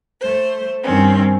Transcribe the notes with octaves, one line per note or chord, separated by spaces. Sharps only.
A3 C5
G2 D#3 C4 C#4